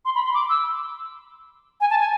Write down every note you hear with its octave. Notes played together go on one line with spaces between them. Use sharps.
C6
B5
C6
D6
E6
G#5
A5
G#5